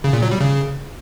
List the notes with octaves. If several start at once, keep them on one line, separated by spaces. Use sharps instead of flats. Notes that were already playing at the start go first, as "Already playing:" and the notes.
C#3
A#2
F#3
G3
C#3